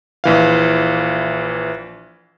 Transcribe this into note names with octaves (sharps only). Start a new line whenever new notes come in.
A#1 E3 F5